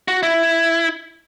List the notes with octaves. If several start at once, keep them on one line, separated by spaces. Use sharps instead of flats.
F#4
E4